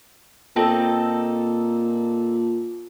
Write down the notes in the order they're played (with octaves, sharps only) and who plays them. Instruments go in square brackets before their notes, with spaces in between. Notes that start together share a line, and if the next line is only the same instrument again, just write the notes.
[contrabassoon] A#2 [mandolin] C4 D#4 A4